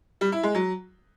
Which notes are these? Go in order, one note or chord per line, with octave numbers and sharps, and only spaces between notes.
G3
E4
G#3
F#3